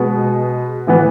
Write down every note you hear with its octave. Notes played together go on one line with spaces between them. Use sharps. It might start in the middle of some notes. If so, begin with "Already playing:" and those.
Already playing: B2 G#3 B3
A2 E3 B3